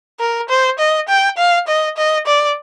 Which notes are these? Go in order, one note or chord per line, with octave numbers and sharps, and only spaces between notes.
A#4
C5
D#5
G5
F5
D#5
D#5
D5